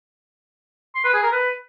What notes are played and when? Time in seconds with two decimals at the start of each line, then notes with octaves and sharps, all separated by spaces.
0.95 C6
1.04 B4
1.14 G#4
1.23 A#4
1.32 B4